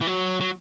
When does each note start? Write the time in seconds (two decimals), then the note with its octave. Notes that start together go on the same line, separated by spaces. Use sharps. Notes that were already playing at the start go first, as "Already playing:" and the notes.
0.01 E3
0.07 F#3
0.40 F#3